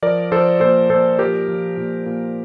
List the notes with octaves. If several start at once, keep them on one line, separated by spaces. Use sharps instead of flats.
F3 A#4 D5
F3 A4 C5
A#2 A4 C5
A#2 A4 C5
F3 G4 A#4
F3
A#2
A#2